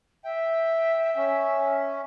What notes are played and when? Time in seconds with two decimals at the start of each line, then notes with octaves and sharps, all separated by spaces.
0.24 E5 G5
1.16 C#4